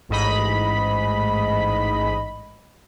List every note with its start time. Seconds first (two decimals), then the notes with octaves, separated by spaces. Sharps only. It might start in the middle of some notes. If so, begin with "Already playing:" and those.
0.09 A1 G#2 D#5 B5